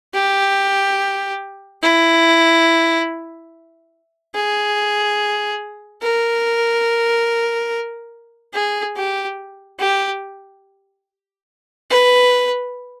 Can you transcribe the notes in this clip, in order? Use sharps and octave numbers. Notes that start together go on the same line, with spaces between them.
G4
E4
G#4
A#4
G#4
G4
G4
B4